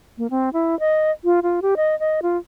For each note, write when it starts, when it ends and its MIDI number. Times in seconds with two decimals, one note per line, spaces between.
0.18 0.27 58
0.30 0.49 60
0.53 0.78 64
0.80 1.11 75
1.24 1.40 65
1.43 1.60 65
1.62 1.75 67
1.77 1.98 75
2.00 2.20 75
2.22 2.37 65